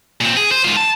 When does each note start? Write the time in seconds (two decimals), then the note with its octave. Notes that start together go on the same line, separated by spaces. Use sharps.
0.21 A#2 C4
0.37 G#4
0.51 C5
0.65 G#2 F4
0.77 A5